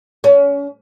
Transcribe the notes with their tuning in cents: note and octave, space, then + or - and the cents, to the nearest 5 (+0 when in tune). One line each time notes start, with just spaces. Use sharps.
C#4 +30